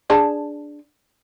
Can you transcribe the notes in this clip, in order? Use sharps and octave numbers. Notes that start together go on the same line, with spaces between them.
D4 G#4 A5